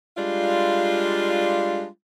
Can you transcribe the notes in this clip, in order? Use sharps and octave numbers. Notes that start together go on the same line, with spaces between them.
G3 G#3 D4 F4